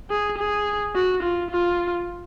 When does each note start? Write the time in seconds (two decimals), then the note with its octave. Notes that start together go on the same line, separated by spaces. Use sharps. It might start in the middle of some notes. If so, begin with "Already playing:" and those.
0.10 G#4
0.38 G#4
0.95 F#4
1.23 F4
1.51 F4